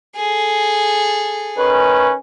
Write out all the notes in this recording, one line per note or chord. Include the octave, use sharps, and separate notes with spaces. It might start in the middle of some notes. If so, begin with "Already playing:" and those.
G#4 A4
D#3 C#4 B4